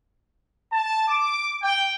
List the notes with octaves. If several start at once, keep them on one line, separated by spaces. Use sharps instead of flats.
A5
D6
G5